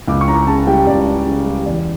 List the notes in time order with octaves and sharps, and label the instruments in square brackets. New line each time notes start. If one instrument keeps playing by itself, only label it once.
[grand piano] C#2 D6
C#6
C#4 A#5
C#3 A5
G3 G5
C#2 D5
C#4
C#3
G3
E2 D5